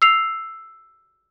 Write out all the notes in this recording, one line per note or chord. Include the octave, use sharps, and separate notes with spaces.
E6 C7 F7